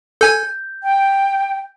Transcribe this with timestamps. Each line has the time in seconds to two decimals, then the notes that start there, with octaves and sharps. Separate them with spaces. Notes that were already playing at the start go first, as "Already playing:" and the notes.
0.21 A4 G#5 G6 G#6
0.83 G5